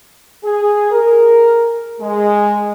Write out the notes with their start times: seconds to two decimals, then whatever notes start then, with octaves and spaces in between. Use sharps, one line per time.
0.44 G#4
0.91 A#4
2.01 G#3